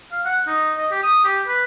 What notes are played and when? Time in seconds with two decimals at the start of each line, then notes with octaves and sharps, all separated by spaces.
0.12 F5
0.25 F#5
0.47 D#4
0.78 D#5
0.91 G4
1.03 D#6
1.24 G4
1.47 B4